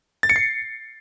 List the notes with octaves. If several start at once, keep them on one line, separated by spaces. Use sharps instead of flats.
A6
C#7
C7